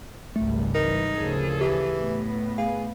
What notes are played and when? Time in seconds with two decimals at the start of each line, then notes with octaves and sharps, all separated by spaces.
0.36 G#1 C#2 G3 A3
0.75 E3 D#4 A#4
1.16 D2 C#3 F3 G#4 A4
1.61 E3 G4
2.00 A2 B3
2.58 G#4 F5